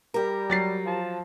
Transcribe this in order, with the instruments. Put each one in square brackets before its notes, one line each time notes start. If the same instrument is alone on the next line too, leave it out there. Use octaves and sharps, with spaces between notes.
[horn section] G3 [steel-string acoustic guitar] G4 A#4
[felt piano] F#3 A6 C7
[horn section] F3 A5